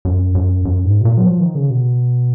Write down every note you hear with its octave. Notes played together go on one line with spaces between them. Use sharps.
F#2
F#2
F#2
G#2
B2
A#2
F#3
F3
D#3
C#3
B2